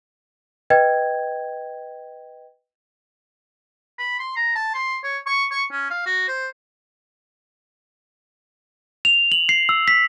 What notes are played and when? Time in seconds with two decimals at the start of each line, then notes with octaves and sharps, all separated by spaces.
0.70 B4 D#5 G5 G#6
3.99 B5
4.19 C6
4.36 A#5
4.55 A5
4.74 C6
5.04 C#5
5.26 C#6
5.51 C#6
5.71 C#4
5.90 F5
6.06 F#4
6.28 C5
9.05 F7
9.32 F#7
9.49 C7
9.69 E6
9.88 B6